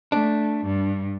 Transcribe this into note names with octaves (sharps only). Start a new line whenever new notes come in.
A3 D4
G2